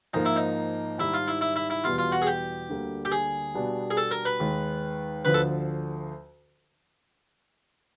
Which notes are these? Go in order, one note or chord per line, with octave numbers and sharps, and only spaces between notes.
G#2 F3 A#3 D#4
E4
D#4
G#2 D#3 G3 E4
F4
E4
E4
E4
E4
E2 B2 G3 B3 F4
F4
F#4
G#4
G4
D2 D3 G3 A#3
G4
G#4
B2 G3 B3 D4
G#4
A4
A#4
B4
D#2 D#3 G#3
D2 D3 F3 B4
A4